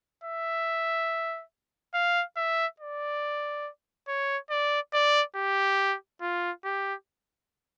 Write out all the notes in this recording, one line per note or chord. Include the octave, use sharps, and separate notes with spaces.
E5
F5
E5
D5
C#5
D5
D5
G4
F4
G4